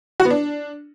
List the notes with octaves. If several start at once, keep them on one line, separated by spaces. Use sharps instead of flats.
F#4
B3
D4